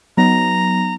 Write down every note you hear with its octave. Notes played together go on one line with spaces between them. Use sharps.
F#3 B3 D#4 A#5